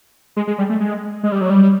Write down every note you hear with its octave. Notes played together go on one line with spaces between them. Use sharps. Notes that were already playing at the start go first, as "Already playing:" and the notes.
G#3
G#3
G3
A3
G#3
G#3
G3
F#3
G3